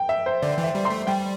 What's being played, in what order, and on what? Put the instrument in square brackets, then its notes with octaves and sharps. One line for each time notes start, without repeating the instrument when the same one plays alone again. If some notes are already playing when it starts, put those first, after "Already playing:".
Already playing: [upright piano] G5
E5
C5
[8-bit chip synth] D3 [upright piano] D5
[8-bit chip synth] E3
[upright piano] E5
[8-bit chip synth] G3
[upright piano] C6
[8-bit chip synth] A3
[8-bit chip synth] G3 [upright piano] G5